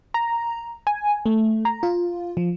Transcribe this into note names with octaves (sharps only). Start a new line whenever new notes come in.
A#5
G#5
A3
A#5
F4
F3